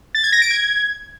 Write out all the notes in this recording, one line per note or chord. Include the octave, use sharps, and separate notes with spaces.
A6
G#6
A#6
D7
G#6